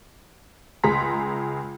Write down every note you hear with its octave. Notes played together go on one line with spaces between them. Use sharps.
C#2 G#4 A#5 C6 B6